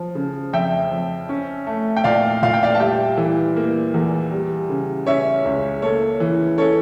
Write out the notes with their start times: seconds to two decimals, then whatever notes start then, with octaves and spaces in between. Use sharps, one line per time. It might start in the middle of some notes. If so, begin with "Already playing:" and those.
Already playing: F3
0.15 C#3
0.53 F2 E5 G5
0.92 F2
1.29 C#4
1.67 A3
1.97 G5
2.04 A#2 D5 F5
2.43 A#2 F5
2.54 G5
2.63 D5 F5
2.74 A5
2.80 G3 E5 G5
3.17 E3
3.56 A#3
3.94 E2
4.32 G3
4.69 C#3
5.07 C#4 C#5 E5
5.45 C#2
5.82 A#3 A4 C#5
6.20 E3
6.58 C#4 A4 C#5